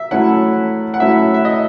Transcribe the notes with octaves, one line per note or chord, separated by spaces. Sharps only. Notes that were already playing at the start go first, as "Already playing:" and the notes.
Already playing: E5
F#3 A3 C#4 E4 F#5
F#5
F#3 A3 C#4 E4 E5
E5
D#5